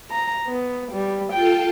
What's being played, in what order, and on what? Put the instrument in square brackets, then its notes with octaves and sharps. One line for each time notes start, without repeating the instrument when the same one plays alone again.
[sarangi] A#5
B3
G3
[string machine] F4 A4 A5 [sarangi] G5